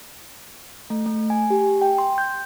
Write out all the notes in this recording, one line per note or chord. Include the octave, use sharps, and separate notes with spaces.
A3
A3
G#5
G4
G5
C6
G6